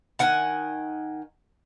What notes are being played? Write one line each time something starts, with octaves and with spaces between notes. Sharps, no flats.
D#3 F#5 G#5